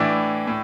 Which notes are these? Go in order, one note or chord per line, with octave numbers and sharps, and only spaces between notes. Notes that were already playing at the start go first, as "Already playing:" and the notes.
Already playing: A2 E3 D4 D5
A2